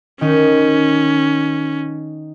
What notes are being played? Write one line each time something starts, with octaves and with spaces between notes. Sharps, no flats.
D#3 C#4 D#4